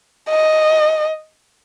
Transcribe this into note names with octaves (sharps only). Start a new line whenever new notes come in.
D#5